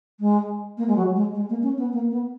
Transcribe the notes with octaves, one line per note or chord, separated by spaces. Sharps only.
G#3
A#3
G#3
F#3
G#3
G#3
A#3
C#4
B3
A#3
B3